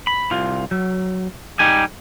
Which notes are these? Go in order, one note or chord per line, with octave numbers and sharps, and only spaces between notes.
B5
C2 F4
F#3
G3 D#4 G4 G#5